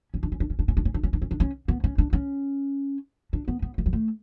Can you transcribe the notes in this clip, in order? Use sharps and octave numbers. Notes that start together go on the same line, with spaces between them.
C#4
D4
C#4
D4
C#4
D4
C#4
D4
C#4
D4
C#4
D4
C#4
D4
C#4
B3
C#4
D4
C#4
D4
B3
B3
A3
G3
A3